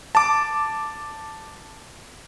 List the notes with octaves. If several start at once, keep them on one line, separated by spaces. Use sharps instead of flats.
A5 D6